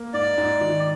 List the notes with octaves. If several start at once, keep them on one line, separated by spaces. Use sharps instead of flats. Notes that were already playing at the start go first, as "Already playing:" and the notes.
Already playing: A#3
G#2 D5
G#2
D#3